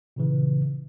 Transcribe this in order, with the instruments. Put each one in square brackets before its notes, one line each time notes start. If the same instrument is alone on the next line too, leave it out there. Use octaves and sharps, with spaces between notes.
[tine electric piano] A#2 C#3 E3